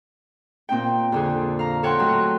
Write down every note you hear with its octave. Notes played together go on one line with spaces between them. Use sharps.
A#2 C4 D#4 G5
F2 D3 G#4
F5 A#5
A4 C#5 F#5 G5 A#5 C6
A2 F#3 D#5